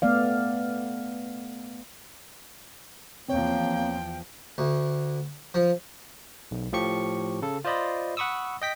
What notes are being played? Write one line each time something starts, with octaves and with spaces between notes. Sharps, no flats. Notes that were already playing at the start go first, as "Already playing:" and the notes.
A3 B3 D5 F5
E2 F3 A#3 C4 C#5 G5
D2
F3
B1
A2 F3 G4 C#6 C#7
C#3 A4
F4 C5 D5 D#5 B5
F#5 B5 C#6 D#6 E6
D#5 G5 B6